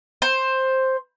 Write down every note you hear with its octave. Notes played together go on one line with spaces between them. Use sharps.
C5